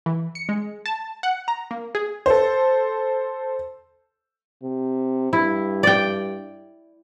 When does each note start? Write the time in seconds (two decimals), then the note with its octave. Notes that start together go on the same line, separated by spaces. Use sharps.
0.06 E3
0.35 C#7
0.49 G#3
0.86 A5
1.23 F#5
1.48 A#5
1.71 A#3
1.95 G#4
2.26 A4 C5
4.63 C3
5.33 G2 E4
5.83 D5 G5